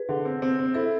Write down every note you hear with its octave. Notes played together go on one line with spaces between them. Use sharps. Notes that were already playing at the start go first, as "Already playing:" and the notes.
Already playing: G#4 B4
D3
C4
C4
C4
E4 A4 C5